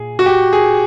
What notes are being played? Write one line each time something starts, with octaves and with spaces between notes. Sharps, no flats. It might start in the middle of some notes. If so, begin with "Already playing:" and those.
Already playing: A#2 G#4
F#4
G4
G#4